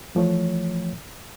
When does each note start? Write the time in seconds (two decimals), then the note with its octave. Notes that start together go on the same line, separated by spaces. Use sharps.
0.15 E3 F3 A3 C#5